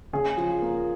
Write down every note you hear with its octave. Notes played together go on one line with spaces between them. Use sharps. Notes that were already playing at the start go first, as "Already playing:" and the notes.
C#3 G#4
F3
A#3